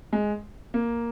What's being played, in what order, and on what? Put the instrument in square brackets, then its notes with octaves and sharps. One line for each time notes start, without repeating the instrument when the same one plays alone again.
[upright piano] G#3
A#3